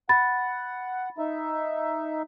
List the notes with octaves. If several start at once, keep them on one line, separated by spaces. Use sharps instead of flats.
F#5 B5 A6
D#4 E5